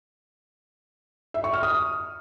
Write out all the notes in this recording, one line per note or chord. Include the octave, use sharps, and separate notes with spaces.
E5
C#6
F6
D#6